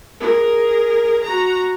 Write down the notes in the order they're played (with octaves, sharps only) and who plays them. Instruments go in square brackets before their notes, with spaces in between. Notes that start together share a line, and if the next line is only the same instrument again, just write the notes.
[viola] G#4 A#4
F#4 A#5